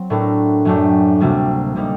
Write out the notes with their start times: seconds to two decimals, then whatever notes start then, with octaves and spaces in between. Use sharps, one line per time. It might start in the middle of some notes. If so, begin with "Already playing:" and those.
Already playing: F#3 C4
0.10 A2 A3 D4 F#4 A#4
0.65 F#2 F#3 A3 D4 G4
1.20 D2 C3 G3 A#3 F#4
1.75 C3 G3 A#3 D#4